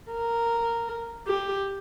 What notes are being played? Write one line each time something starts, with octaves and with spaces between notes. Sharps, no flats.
A#4
G4